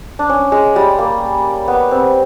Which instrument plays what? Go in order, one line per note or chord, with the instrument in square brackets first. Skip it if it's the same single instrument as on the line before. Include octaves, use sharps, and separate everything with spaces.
[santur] D4
C#4
G#3
G3
A#3
B3
C4